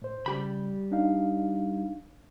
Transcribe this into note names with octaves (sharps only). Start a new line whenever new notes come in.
A2 C5
C#3 G3 G4 B5
D4 D#4 F5